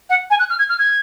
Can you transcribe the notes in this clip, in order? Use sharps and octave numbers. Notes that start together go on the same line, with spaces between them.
F#5
G#5
F#6
F6
G#6
F6
G#6